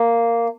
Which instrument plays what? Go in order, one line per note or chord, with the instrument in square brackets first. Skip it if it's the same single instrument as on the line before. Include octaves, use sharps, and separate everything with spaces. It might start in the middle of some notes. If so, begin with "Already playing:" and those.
Already playing: [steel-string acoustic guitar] A#3